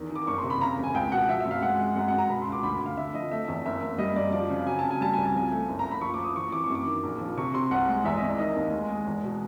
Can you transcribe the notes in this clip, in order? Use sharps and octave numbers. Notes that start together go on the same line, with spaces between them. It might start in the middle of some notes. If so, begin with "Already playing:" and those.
Already playing: E2 D#3
D#3
D6
F#1 C#6
C6
C3
B5
C#3 A#5
E1
G#5
C#2 G5
B2 F#5
F3 E5
E5
F#2
F5
G#3 F#5
G#3
F#2 F#5
F#5
F#2 A#5
B2 B5
C6
C#2 D6
D2 B5
D2
F5
D3 E5
F3 D#5
A3 E5
E2
F#1 E5
F#1
G3 D#5
F#2 D5
F3 D5
C#3
F#3 G#5
C#3 A5
G#5
G3 A5
C2 G#5
A5
F3 G#5
A3
F#1
A#5
F#1
B5
F3 C#6
D6
F3
D#6
E3 C#6
E3 D6
C#6
F#2
D6
D#3
A#1
F3
C3 C#6
C3 C6
C2 F#5
G#3
E2 E5
D#5
E2
D5
D#3 D#5
D#2
G#3
G#3
E2
B2